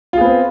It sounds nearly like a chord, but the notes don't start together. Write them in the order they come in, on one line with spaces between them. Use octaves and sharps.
F4 G#4 B3 C4